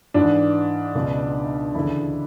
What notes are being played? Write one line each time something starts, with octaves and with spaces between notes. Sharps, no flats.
G#2 E3 D4
C#2 B2
D2 C#3 E3 E4